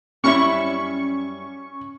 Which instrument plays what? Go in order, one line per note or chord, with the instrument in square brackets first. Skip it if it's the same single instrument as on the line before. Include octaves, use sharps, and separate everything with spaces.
[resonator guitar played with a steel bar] F#2 G3 E4 [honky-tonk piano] C#4 [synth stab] C#6